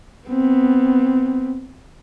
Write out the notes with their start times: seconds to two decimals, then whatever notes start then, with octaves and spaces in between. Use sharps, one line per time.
0.28 B3 C4